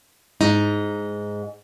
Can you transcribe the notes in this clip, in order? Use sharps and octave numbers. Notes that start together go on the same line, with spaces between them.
G#2 D#4